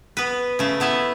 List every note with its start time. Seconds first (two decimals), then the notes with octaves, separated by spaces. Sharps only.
0.17 B3 B4
0.59 C#3 A3
0.80 A3 B3 E4 E5